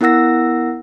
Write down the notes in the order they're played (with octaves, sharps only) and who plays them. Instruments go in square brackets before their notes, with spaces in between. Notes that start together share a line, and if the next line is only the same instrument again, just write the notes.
[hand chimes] B3 E4 A#4 F#5 E6 A#6